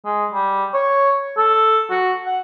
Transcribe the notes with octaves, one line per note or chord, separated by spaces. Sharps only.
G#3
G3
C#5
A4
F#4
F#5